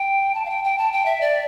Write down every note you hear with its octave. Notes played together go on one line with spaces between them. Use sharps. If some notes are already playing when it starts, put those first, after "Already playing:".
Already playing: G5
A5
F5
G5
G5
A5
G5
E5
D5